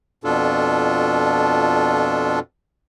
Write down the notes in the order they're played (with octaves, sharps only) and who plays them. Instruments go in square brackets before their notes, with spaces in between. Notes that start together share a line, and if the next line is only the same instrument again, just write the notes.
[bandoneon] F2 B2 D4 F4 A4